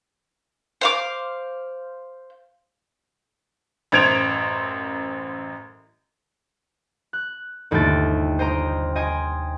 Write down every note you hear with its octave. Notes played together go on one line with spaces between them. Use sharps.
C5 F5 D6
A1 F#2 C5 G#6 D7 F7
F#6
G1 D#2 C3 A3 G5 A6
C5 D#5 G5 A#5
D#5 G5 G#5 C6